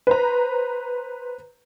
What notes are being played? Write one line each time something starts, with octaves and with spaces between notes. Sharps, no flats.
B4 C5 A#5